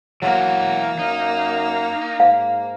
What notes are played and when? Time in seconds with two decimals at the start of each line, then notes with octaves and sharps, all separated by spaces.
0.22 E3 F#3 A#3 F#4
0.99 F#2 D#4
2.20 G#2 F5